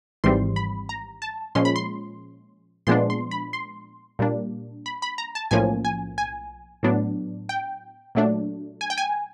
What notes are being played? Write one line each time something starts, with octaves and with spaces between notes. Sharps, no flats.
G#1 G#2 E3 G3 C4 C6
B5
A#5
A5
A#2 F3 G#3 C#4 C6
B5
C6
A#2 F3 G#3 B3 D4 C6
C6
B5
C6
A#2 G3 A#3 D4
B5
B5
A#5
A5
B1 A2 F3 A#3 C#4 G#5
G#5
G#5
A2 F#3 B3 D4
G5
A#2 F#3 A3 D4
G#5
G5
G#5